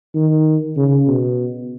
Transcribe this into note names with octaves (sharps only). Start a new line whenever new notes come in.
D#3
C#3
B2